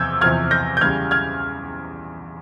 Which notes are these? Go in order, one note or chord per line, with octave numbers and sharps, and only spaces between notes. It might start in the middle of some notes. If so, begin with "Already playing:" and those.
Already playing: E2 C3 F3 E6 G6 G#6
E2 C3 F3 F6 G#6
G6 A#6
G6
E2 C#3 G3 F6 G#6
F6 G#6